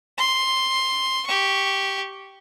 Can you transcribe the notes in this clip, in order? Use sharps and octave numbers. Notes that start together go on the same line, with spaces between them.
C6
G4 C#6